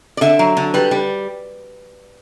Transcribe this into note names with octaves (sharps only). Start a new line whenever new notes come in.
D5
D3 E5
F#3
D3
G3 B4
G3